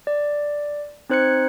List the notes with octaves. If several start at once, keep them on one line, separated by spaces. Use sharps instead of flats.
D5
C4 D#4 C5 F#6 G#6 C#7